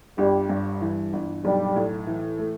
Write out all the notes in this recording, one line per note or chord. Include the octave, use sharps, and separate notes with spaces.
G1 G3
G2
E3
G1
B1 G3
A2
E3
A3